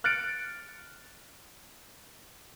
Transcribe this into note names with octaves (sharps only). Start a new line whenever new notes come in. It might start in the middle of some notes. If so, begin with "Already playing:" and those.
F6 F#6 A6 C#7 D7